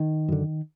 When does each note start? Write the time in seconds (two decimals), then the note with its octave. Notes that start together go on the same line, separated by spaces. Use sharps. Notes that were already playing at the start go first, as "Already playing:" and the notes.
Already playing: D#3
0.28 F#2 D3